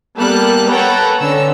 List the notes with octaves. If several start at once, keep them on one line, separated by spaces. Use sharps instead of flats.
G3 A#3 B3 A4 F#6
A4 B4 C#5 F#5 G5 A#5
D3 C#4 E6